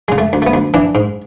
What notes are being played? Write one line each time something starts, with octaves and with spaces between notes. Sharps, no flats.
C#3 G#3
A3
D2
A3
B3
D2
E3 D4
G#2